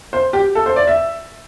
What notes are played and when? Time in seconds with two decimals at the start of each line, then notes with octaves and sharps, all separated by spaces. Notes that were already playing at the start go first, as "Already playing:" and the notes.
0.13 C5
0.33 G4
0.55 A4
0.66 C5
0.76 D5
0.87 E5